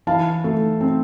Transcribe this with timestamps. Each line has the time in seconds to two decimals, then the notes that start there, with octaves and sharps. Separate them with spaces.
0.07 E3 F5 A5
0.44 A3
0.81 C4